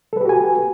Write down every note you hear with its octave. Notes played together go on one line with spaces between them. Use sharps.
F#4 G4 A4 B4 G#5